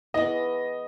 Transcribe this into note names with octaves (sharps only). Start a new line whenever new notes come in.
E3 G#3 B3 D#5